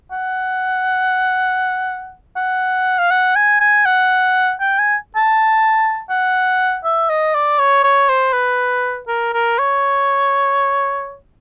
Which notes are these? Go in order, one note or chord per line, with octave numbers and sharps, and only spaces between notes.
F#5
F#5
F5
F#5
G#5
G#5
F#5
G5
G#5
A5
F#5
E5
D#5
D5
C#5
C#5
C5
B4
A#4
A#4
C#5